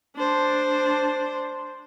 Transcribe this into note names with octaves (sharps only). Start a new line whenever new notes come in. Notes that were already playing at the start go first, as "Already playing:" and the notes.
D4 C5